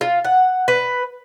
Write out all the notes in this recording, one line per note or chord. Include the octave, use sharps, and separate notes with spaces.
F4
F#5
B4